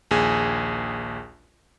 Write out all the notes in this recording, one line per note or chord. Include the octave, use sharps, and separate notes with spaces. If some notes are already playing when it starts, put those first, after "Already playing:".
A#1 D#2 G#4 G#5